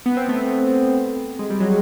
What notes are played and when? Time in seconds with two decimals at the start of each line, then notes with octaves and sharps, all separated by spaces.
0.06 B3
0.17 C4
0.28 A3 B3
1.39 G#3
1.50 G3
1.60 F#3 G#3